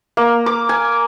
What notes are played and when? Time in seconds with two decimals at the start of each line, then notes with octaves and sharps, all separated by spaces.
0.17 A#3
0.46 D6
0.69 G#5